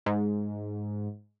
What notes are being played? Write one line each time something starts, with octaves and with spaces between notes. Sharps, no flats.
G#2